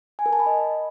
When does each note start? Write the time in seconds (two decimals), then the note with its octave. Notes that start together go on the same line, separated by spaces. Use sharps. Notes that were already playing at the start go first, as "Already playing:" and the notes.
0.19 G#5
0.26 A#4
0.33 A5
0.40 B5
0.46 D#5